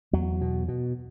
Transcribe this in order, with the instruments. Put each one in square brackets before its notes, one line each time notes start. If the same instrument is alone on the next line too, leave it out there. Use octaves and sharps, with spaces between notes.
[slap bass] E2 F#3
B2
B2